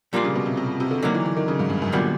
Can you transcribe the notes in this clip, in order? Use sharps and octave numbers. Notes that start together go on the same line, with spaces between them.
A#2 F3 G3 A#3 D4 F4
C#3
B2
C3
C3
C3
D3
D3 D#3 F#3 A#3
E3
E3
D#3
C#3
G#2
G2
F#2
F#2 A#2 D3 G3 B3